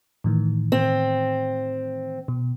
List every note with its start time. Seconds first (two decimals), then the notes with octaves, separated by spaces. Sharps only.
0.24 A2 D#3 E3
0.72 C4
2.28 B2